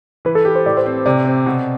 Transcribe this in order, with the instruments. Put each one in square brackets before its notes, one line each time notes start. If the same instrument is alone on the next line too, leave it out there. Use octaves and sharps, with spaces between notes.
[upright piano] E3 [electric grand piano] B4
[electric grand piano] A4
[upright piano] G4
[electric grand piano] C5
[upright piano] A2 [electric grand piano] D5
[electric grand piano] C5
[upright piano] C4
[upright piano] C3 [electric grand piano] D5
[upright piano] C4
B2